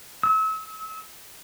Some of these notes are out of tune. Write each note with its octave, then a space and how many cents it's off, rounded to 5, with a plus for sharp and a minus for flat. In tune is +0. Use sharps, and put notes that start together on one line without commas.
E6 -35